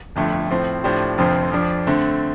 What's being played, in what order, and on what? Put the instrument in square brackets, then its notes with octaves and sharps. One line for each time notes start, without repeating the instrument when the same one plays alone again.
[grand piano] G1 F2 D3 A3
A2 F3 C4
A2 F3 D4 G4 C5
F1 F2 D3 F3 C4
F2 F3 D4
D3 A3 C4